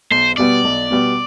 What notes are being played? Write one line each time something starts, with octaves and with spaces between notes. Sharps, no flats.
B1 C5
B2 G3 B3 D5
B1
B2 G3 B3